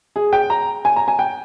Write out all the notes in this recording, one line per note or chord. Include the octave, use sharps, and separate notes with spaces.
G#4
G5
A#5
G#5
A#5
G#5
G5